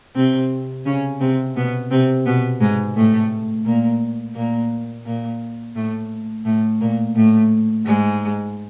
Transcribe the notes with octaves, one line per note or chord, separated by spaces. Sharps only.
C3 C4
C#3 C#4
C3 C4
B2 B3
C3 C4
B2 B3
G#2 G#3
A2 A3
A#2 A#3
A#2 A#3
A#2 A#3
A2 A3
A2 A3
A#2 A#3
A2 A3
G#2 G#3